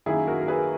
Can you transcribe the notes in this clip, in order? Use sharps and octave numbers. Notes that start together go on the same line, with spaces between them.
F#2 D#3 A#3 E4 G#4
F#4 A#4
A#4
G#4 B4